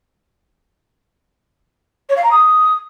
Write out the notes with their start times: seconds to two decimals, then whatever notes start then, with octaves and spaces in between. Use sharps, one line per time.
2.09 C#5
2.17 F5
2.24 A#5
2.31 D#6